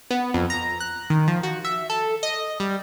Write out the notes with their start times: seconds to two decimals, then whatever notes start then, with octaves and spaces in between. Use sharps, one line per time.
0.11 B3
0.34 F2
0.50 A#5
0.80 F#6
1.10 D#3
1.28 F3
1.43 F#4
1.65 E5
1.90 A4
2.23 D#5
2.60 G3